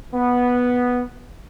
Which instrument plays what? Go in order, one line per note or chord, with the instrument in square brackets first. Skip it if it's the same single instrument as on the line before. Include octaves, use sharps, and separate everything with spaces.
[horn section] B3